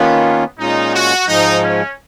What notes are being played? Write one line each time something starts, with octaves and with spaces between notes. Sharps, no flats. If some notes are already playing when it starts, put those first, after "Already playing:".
Already playing: D#3 A#3 B3 C#4 F4
A#2 G#3 C#4 D#4 F4
F#4
G#2 F3 G#3 D#4
C#4